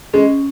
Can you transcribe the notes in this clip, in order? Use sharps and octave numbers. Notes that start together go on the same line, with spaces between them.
G#3 C#4